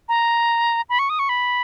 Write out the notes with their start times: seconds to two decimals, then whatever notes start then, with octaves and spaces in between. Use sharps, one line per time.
0.08 A#5
0.89 B5
0.99 C#6
1.09 D#6
1.19 C#6
1.29 B5